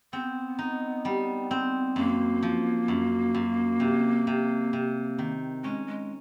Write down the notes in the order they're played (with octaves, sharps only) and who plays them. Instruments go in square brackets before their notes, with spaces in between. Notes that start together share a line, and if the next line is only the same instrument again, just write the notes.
[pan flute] B3 [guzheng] C4
[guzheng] D#4
G3
C4
[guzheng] F#2 [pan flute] A#3
[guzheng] F3
F#2
F#2
C3
C3
C3
D#3
[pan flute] G#3 [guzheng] C#4
[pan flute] G#3